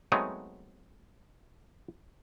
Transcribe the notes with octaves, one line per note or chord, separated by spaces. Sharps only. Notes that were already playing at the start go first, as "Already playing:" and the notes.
F#3 G#3 A3 B3 C4 D#4